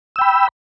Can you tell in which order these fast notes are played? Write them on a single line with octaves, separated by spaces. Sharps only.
E6 G5 B5